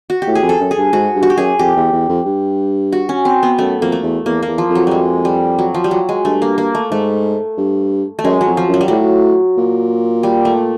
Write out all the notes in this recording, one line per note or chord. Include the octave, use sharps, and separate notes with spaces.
F#4
G4
A2
G#4
F2
A4
F#2
G#4
G2
G#2 F#4
G2
F#4
G4
F#2 G#4
F2 G4
E2
E2
F2
G2
F#4
C#4
C4
B3
F#2 A3
F2 A#3
A3
E2
E2 A#3
E2 A#3
F3
F2
F#3
G3 G#3
G3
F#3
F3
G3
F#3
G#3
G2 A3
A#3
A#3
A3
G#2 A3
G2
A3
F#2 G#3
F#3
F2
F3
F#2
F#3
G3
A2 F#3
A#2
G3
A3